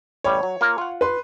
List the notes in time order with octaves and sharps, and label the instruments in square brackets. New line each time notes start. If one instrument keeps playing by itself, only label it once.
[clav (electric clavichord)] A1 G3 [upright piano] C#5
[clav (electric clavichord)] F#3
A#3 F4 A#4
F4 F#5
[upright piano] B4 C6